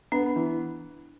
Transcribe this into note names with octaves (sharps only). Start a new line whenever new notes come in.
B3 D4
E3